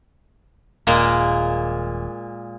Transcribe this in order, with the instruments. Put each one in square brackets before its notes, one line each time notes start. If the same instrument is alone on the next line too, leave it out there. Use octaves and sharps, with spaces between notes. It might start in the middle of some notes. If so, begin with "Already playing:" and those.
[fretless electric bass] D#1 [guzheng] A#2 G#3 A#3